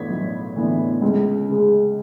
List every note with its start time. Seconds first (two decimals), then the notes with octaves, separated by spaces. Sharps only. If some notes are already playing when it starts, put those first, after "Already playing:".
Already playing: A2 E3 B3 D4 G#6 B6
0.10 B1
0.56 A2 E3 B3 D4
1.02 C#2
1.49 C#3 G#3